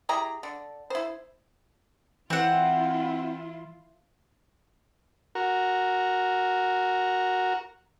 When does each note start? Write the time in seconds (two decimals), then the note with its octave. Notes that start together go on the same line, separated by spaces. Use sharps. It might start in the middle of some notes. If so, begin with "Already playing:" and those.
0.09 E4 G4 G#4 A#5
0.43 D3
0.90 E4 C5
2.30 E3 C4 E4 F4 F#5
5.35 F#4 A#4